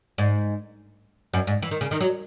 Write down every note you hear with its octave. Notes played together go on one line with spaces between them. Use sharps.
G#2
F#2
G#2
E3
D#3
C#3
D#3
F#3